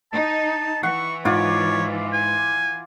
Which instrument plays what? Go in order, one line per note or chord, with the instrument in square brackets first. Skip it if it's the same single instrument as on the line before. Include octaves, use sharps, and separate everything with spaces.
[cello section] D#4 [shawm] A5
[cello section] E3 [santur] F#5 [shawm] C#6
[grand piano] G#2 [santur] F4 D5 F#5 [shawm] C#5
[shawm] G#5